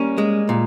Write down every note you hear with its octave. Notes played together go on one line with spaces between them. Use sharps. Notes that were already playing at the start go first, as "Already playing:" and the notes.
Already playing: G3 A#3 C#4
G#3
A#2